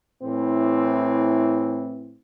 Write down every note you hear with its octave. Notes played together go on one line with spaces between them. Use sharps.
A2 E3 C4